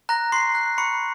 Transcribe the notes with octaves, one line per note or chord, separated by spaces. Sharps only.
A#5 F#6 A#6
C6 C#6 C7
F#6
B5 C#6 C#7